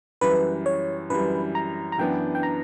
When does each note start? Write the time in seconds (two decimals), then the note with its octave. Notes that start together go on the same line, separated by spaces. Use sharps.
0.21 F#2 E3 G3 B4
0.66 C#5
1.10 F#2 E3 G3 B4
1.55 A#5
1.92 A#5
1.98 F#2 E3 B3 D4 G5
2.35 G5
2.43 A#5